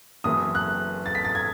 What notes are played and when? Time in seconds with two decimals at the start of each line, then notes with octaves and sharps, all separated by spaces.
0.24 F#1 F#2 E3 B3 D#6
0.55 F#6
1.06 A6
1.15 B6
1.25 A6
1.35 G#6